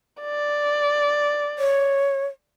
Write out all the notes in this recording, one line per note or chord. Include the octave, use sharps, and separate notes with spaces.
D5
C#5